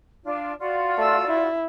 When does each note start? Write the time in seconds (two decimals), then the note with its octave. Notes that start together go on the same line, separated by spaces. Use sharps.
0.23 D4 F4
0.59 F4 F#4 D5
0.98 A3 E6
1.28 E4